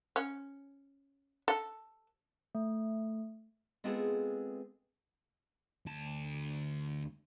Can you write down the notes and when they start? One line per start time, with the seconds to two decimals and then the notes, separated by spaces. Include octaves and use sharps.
0.16 C#4
1.48 A4
2.55 A3
3.84 G#3 B3 C4 F4 G#4 A4
5.86 D2 A5